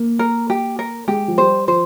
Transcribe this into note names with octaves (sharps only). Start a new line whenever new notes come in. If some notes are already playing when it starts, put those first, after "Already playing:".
Already playing: A#3
A#4
G4
A#4
G#3 G4
F3
G3 C5
F3 C5